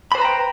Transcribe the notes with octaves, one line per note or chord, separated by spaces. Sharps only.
B4 C5 G5 A#5 B5